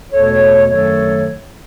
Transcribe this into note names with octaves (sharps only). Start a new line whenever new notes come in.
E2 B2 A3 A4 C#5
F#2 D#3 F#3 A3 A4 C#5